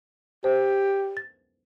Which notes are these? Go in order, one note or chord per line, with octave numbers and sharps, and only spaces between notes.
G4 C5
A6